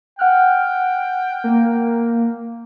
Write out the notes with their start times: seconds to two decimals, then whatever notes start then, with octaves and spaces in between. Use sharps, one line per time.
0.19 F#5 G5 F6 F#6
1.44 A#3